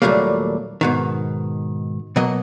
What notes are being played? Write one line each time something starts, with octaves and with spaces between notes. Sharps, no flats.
D#2 A#2 F#3 G3 A3 A#3
G#2 B2 D#3
B2 F#3 A#3 D#5